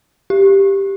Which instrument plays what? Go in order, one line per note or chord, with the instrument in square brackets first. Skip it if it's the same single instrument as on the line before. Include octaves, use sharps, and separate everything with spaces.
[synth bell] G4